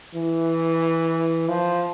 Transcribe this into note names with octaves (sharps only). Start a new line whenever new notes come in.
E3
F3